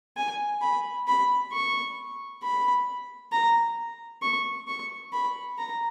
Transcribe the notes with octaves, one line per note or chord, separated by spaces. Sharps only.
G#5
B5
B5
C#6
B5
A#5
C#6
C#6
B5
A#5